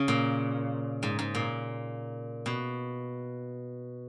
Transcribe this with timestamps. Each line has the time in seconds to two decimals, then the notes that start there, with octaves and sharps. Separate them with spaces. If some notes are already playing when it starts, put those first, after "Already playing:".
Already playing: C#3
0.08 A#2
1.03 G#2
1.19 G#2
1.35 A#2
2.46 B2